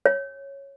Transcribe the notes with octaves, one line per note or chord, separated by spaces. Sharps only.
C#5